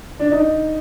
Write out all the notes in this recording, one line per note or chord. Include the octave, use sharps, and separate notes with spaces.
D4
D#4